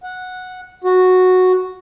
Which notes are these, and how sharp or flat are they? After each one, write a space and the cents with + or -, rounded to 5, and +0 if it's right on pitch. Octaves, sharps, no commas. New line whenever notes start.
F#5 -10
F#4 -5